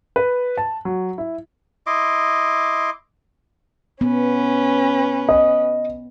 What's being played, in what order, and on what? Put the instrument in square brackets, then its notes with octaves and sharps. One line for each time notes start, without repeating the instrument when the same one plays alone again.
[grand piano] B4
A5
F#3
E4
[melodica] E4 D#5 C6 D6
[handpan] B3 [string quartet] C#4 B4
[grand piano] D#5